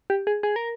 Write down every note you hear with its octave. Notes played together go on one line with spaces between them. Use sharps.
G4
G#4
G#4
A#4